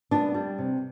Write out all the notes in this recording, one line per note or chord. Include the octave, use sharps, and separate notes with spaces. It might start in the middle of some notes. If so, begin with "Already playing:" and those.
G3 B3 D4
G3
C3